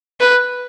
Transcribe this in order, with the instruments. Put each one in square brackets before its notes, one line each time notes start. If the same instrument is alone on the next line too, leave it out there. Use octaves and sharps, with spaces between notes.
[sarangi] B4